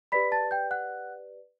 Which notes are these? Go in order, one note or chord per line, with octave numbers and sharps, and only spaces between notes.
G4 B4 D5 B5 B6
A5 A6
G5 G6
F#5 F#6